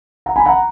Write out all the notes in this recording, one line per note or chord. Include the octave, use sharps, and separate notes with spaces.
F#5 A#5
G#5 B5
F#5 A#5